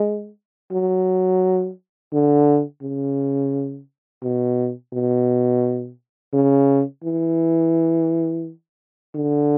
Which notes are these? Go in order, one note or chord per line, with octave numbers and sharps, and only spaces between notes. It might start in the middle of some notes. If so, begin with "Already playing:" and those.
Already playing: G#3
F#3
D3
C#3
B2
B2
C#3
E3
D3